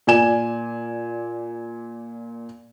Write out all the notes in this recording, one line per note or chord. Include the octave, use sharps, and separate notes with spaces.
A#2 D5 G#5 E7